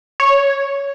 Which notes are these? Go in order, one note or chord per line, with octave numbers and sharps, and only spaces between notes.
C#5